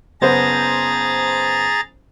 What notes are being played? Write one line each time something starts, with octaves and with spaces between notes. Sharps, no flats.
F#1 B3 G#4 C5 A#5 A6